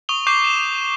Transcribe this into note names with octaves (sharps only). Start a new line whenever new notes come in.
C#6 D#6 F7 G7
C#6 D6 G6 C7
E7